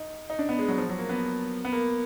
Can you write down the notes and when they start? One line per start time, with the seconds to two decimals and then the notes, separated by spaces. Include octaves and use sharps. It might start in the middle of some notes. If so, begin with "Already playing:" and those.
Already playing: D#4
0.30 D#4
0.39 D4
0.49 B3
0.59 G#3
0.68 F#3
0.78 F3
0.89 F#3
0.98 A#3
1.09 B3
1.65 B3
1.72 A#3